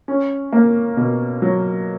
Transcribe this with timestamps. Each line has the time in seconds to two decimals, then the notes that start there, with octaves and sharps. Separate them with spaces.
0.08 C#4
0.52 A#3
0.97 B2
1.42 F#3